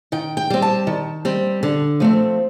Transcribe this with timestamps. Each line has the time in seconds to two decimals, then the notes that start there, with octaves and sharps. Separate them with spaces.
0.12 D#3 G5
0.37 G5
0.50 G3 C4
0.62 A5
0.87 D#3
1.25 G3 C4
1.63 D3
2.00 F3 A3 C4